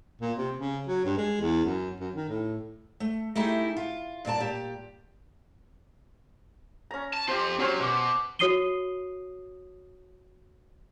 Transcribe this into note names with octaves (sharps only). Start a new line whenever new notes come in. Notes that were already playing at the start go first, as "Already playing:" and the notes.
A#2
C3
C#3
F#3
G2
G#3
E2
F#2
F#2
D#3
A2
A3
A3 D#4 E4 G4 G#4
F4
G2 A#2 D5 A5
A#2 G4
C#4 A#5
A5
C4 F4 G4 C5
F#3 C#4 C5
B2 F#5 D6
F#4 C#5 D#6 C7 D#7 G7